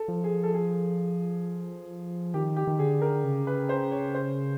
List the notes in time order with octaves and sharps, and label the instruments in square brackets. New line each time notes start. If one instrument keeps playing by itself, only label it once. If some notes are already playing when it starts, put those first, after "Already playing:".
Already playing: [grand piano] A4
[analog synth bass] F3
[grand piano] G#4
A4
G#4
[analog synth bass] D#3 [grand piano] G4
[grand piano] G4
[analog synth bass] D#3
[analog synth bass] D3 [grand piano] G#4
[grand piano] A#4
[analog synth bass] C#3
[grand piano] B4
C5
C#5
C5